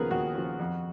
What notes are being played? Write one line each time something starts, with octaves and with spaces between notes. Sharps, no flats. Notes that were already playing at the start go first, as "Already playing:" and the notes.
Already playing: D#2 C#3 F3 B3 G#4 A#4 B4
D#2 F#4
C#3 F3
F2